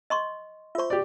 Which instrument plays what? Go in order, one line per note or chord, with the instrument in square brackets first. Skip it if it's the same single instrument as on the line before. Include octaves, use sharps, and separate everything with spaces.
[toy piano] D#5 C6 C#6
[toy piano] F4 C#6 [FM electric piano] C5 E5
[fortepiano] G4 D5